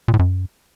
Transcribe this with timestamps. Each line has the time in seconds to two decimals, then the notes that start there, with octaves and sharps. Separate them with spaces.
0.08 A#2
0.14 A2
0.19 F#2